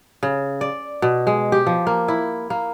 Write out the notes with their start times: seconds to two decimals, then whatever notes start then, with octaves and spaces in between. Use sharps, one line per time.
0.23 C#3
0.61 D5
1.02 B2
1.27 G#3
1.52 G4
1.66 F3
1.87 A#3
2.08 E4
2.50 A#3